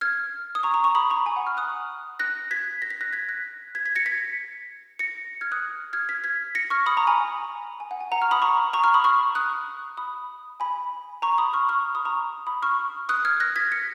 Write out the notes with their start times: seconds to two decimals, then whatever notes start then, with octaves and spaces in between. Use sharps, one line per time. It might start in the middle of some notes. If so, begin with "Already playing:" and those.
0.01 F6 G#6
0.55 D#6
0.63 A#5 C#6
0.74 A#5 C#6
0.84 A#5 C#6
0.95 B5 D#6
1.10 A#5 C#6
1.26 G#5 B5
1.36 F#5
1.47 C#6 F6
1.57 D#6 F#6
2.19 F#6 A#6
2.51 G#6 B6
2.82 A#6
2.90 B6
3.01 F#6 A#6
3.13 G#6 B6
3.29 F#6 A#6
3.75 G#6 B6
3.86 G#6 B6
3.95 A#6 C#7
4.06 G#6 B6
4.99 A#6 C#7
5.41 F6 G#6
5.52 D#6 F#6
5.93 F6 G#6
6.09 G#6 B6
6.24 G#6 B6
6.55 A#6 C#7
6.70 C#6 F6
6.86 B5 D#6
6.97 A#5 C#6
7.07 G#5 B5
7.80 G#5
7.91 F#5
8.00 G#5
8.12 F#5 A#5
8.22 C#6 F6
8.31 B5 D#6
8.42 A#5 C#6
8.73 A#5 C#6
8.84 C#6 F6
8.94 B5 D#6
9.04 C#6 F6
9.35 D#6 F#6
9.97 B5 D#6
10.60 G#5 B5
11.22 A#5 C#6
11.38 B5 D#6
11.53 C#6 F6
11.69 C#6 F6
11.95 B5 D#6
12.05 A#5 C#6
12.47 B5 D#6
12.62 C#6 F6
13.09 D#6 F#6
13.25 F6 G#6
13.40 F#6 A#6
13.56 G#6 B6
13.72 A#6 C#7